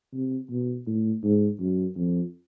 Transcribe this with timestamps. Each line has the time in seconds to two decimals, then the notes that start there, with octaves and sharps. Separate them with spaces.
0.13 C3
0.50 B2
0.87 A2
1.23 G#2
1.60 F#2
1.96 F2